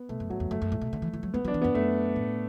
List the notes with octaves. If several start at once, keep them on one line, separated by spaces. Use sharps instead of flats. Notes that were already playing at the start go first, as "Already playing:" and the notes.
Already playing: B3
B2 A3
F#2
A2 F#3
E2
F#2 A3
F#2
A2
B2
D3
E3
E3
F#3
A3 B3
F#3 D4
E3
F#2 B3
F#2 A3
A2